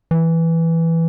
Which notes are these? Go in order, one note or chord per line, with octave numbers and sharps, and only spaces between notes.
E3